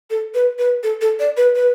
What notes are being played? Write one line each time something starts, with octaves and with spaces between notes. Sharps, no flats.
A4
B4
B4
A4
A4
D5
B4
B4